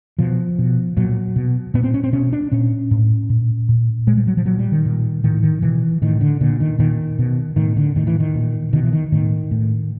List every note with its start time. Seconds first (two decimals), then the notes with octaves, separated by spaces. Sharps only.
0.19 B2 F3
0.59 B2
0.97 A#2 F#3
1.36 B2
1.74 A#2 B3
1.84 C4
1.94 C#4
2.04 C4
2.13 B2 C#4
2.33 D4
2.52 A#2 C#4
2.91 A2
3.30 A#2
3.69 A#2
4.07 A#2 G#3
4.17 G3
4.27 F#3
4.37 F3
4.46 A#2 F#3
4.59 G3
4.72 D#3
4.86 A#2
5.24 A2 D#3
5.43 D#3
5.62 B2 E3
6.02 A2 D#3
6.21 D3
6.41 A#2 D3
6.60 D#3
6.79 A#2 D#3
7.19 B2
7.56 A2 D#3
7.77 D3
7.96 A2 D#3
8.07 E3
8.20 D#3
8.35 A#2
8.73 B2 D#3
8.84 E3
8.93 D#3
9.12 A2 D#3
9.51 A2